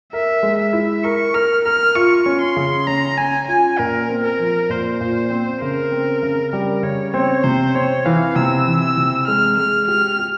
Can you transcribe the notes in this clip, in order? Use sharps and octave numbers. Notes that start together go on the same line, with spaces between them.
A#4 E5
G#3
E5
E4
A#4 C#6
A#4 F6
A#4 F6
F4 C#6
C#4
C6
C#3
C#4 A#5
C#4 G#5
F4 G#5
A#2 A#4
C4
A#4
F3
A#2 C5
A#2
C4
C#3 A#4
C4
C#3
G3 A#4
C#3 C#5
C4 C#5
C3 C5
C4 C#5
E3 F5
C3 E6
E3
E6
C3
G#3 F6
G#3 F6
G4 F6
G4